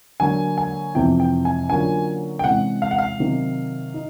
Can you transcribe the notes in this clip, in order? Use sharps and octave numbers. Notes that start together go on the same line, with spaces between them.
D3 F#3 A#3 G#5
G#5
F2 C3 E3 G5
G5
G#5
D3 F#3 A#3 C#4 F4 G#5
G5
C3 E3 G#3 C#4 F#5
F5
F#5
F5
C3 D#3 F#3
D#4